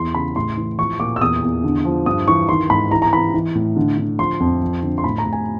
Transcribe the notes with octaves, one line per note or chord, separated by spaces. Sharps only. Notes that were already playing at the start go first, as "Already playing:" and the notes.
Already playing: E2 E3 C6
C#3 B5
A2 C6
E3
F3 C#6
A#2 D6
E6
E2 D#6
E2
D3
F3
G2 D#6
E3 C#6
D#3 C6
G#2 B5
E3 A#5
A#5
E3 B5
E3
A2
D3
D3
F3 C6
F2
F3
D3
C6
A2 B5
A#5
A2
G#5